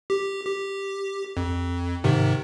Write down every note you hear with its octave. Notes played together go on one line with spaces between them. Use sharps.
G4
G4
F2
G#2 C3 D#3